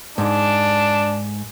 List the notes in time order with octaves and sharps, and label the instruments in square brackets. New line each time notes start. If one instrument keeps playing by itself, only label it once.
[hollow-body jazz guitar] G#2 [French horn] D4